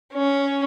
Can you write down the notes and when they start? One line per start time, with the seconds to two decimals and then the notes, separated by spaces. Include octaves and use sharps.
0.12 C#4